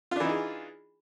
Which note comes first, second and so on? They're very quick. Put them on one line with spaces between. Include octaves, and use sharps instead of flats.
F4 D4 E3 D#4 G#4